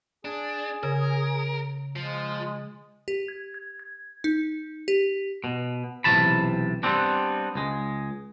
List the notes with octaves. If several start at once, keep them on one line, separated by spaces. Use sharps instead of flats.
D4 G#4
C#3 A#4
F3 G#3
G4
G#6
G#6
G#6
D#4
G4
B2
B1 C3 E3 A5 B5
G3 B3 C4 D4
C#2 G#3